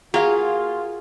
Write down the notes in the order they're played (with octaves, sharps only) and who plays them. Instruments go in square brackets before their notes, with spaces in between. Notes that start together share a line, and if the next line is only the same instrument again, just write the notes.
[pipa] A#3 F5 [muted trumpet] F4 [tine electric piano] F#4 [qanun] G#4